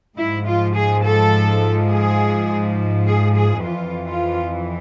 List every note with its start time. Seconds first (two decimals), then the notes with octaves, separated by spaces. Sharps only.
0.17 G#2 F3 E4
0.46 F4
0.76 G#4
1.04 A4
1.91 G#4
3.07 G#4
3.36 G#4
3.64 F2 E3 F4
4.08 F4